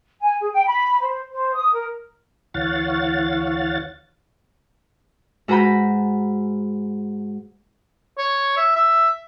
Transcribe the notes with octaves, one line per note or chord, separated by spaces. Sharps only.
G#5
G#4
G5
B5
C5
C5
D#6
A#4
D2 E3 C#5 F5 F#5 A6
G#2 F#4 B4 A#5 B5 G6
C#5
E5
E5